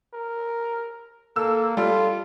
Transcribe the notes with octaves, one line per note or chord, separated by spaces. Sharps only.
A#4
A#3 A4 E6
G3 F4 A4